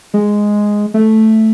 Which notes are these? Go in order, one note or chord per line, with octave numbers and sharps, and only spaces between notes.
G#3
A3